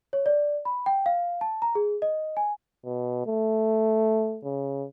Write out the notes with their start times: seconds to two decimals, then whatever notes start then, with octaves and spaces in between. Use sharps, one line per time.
0.13 C#5
0.26 D5
0.65 B5
0.86 G5
1.06 F5
1.41 A5
1.62 A#5
1.75 G#4
2.02 D#5
2.37 G#5
2.85 B2
3.27 A3
4.45 C#3